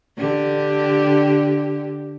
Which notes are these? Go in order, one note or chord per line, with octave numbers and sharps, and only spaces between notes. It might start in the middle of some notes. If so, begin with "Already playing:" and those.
D3 G4